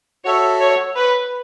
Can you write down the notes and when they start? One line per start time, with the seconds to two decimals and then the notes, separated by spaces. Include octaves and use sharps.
0.25 F#4 A4 C#5 E5
0.60 C#5
0.97 B4